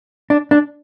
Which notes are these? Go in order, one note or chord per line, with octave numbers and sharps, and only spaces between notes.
D4
D4